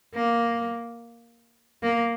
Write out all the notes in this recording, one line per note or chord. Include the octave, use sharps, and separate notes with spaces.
A#3
A#3